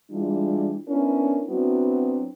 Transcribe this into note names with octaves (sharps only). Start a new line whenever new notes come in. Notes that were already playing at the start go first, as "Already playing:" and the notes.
E3 G3 G#3 D4 E4 F4
B3 C#4 D4 E4 A#4
F#3 B3 C4 D4 E4 F#4